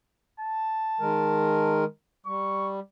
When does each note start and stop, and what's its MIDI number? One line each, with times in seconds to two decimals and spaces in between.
0.40 1.80 81
1.00 1.84 51
1.00 1.84 56
1.00 1.84 70
2.26 2.80 55
2.26 2.70 85